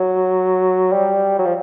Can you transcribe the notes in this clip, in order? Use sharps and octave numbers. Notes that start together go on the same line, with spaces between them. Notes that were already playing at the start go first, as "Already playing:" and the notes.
Already playing: F#3
G3
F#3
F3